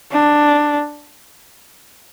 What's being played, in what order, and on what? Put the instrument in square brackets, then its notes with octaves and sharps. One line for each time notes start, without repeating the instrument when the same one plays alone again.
[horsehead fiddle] D4